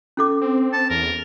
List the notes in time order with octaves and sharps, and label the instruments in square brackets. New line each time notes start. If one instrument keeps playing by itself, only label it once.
[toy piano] C#4 A4 D6
[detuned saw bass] C4
[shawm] A5
[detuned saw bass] E2 [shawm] A#4